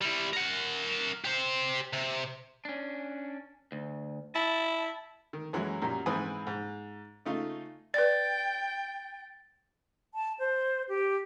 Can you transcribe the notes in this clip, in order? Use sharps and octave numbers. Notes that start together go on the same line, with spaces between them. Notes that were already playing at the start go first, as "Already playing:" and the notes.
G3 E4
A#4 F#5
G4 C5
C3
C#4 D4
D2
E4 A5
D#3
F#2 E3 F#3 G#3
F#2 A#2 G3
G#2 E3 C4 B4 G#5 D#6
G#2
C#3 A3 D#4 F4
B4 D5 G5 A6
A5
C5
G4